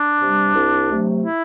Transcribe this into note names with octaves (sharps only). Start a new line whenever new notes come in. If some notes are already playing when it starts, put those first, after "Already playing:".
Already playing: D4
C3 G3
C2
C3 F#3 A3
E4